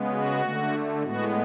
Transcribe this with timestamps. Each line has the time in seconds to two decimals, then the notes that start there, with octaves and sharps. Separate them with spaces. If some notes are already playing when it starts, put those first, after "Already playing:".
Already playing: C#3 G#3 B3
0.11 F#4
0.41 D3 A3
1.02 A2 G#3 B3 F#4